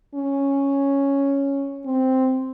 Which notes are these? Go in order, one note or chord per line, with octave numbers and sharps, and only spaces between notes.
C#4
C4